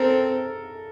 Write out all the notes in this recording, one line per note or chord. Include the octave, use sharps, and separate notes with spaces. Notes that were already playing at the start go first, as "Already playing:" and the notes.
Already playing: C4 A4 A#4